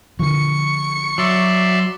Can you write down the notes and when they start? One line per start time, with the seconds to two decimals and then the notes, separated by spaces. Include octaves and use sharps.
0.19 D3 F3 C#6 C#7
1.18 F#3 D5 E5 C6